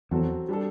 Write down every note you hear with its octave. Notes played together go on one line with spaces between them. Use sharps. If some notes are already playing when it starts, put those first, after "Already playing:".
E2 F#3 C4 F#4 A4
G3 D4 A4